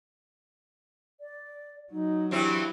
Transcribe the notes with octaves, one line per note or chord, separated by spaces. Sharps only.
D5
F#3 D#4
G2 E3 C4 E4